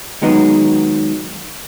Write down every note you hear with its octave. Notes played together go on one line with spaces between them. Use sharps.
D#3 F#3 G#3 B3 D#4